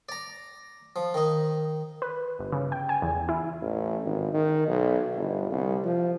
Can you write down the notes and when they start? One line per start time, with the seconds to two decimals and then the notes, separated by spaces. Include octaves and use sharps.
0.09 D5 A#5
0.96 F3
1.14 D#3 D#4
2.02 B4
2.39 G1
2.52 C#3
2.72 G5
2.89 G#5
3.02 E2
3.29 E4
3.61 A1
4.04 G#1
4.33 D#3
4.67 B1
5.16 G1
5.51 C2
5.84 F3